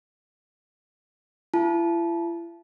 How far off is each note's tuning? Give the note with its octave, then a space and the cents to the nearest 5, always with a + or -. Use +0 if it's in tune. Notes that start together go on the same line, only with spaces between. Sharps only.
E4 +40 A5 -20